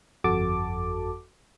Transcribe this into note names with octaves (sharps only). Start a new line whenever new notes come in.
G1 F2 F#4 A4 A5 D6